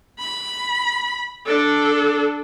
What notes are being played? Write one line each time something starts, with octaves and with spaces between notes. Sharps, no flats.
B5
D4 A4